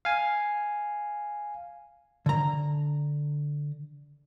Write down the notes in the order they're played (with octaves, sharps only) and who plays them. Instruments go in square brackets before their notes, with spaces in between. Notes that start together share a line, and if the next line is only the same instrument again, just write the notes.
[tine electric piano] F5 G#5
[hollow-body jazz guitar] D3 A#5